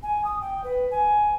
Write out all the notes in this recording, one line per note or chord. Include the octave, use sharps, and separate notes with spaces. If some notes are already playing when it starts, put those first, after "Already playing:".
G#5
D#6
G5
B4
G#5